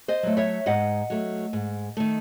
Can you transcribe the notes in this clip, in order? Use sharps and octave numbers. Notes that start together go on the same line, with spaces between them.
C5 D#5
F#3 A3
C#5 E5
G#2 D#5 F#5
F#3 A3
G#2
D#3 A3